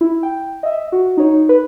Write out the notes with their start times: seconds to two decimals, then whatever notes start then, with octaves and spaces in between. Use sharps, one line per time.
0.01 E4
0.23 G5
0.63 D#5 E5
0.92 F#4
1.17 D#4 C#5
1.49 B4